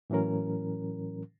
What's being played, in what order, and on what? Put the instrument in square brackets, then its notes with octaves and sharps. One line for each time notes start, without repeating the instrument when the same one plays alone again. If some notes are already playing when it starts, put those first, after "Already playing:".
[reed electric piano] A2 E3 F#3 C#4 A#4